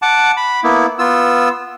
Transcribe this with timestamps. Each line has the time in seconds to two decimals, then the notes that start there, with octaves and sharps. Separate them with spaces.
0.02 F#5 A5 D6
0.37 B5
0.64 A#3 B3 E4
0.99 B3 F4 E6